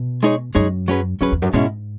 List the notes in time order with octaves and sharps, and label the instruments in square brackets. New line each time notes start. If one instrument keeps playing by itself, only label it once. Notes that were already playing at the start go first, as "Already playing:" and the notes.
Already playing: [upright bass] B2
[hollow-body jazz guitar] G#3 D#4 G#4 C#5
[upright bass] F#2 [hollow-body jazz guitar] G#3 D#4 G#4 C#5
[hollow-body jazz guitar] F#3 C#4 G#4 B4
[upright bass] F#2 [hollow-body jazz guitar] F#3 C#4 G#4 B4
[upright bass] E2
F#2
[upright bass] G#2 [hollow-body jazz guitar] B2 G#3 C#4 E4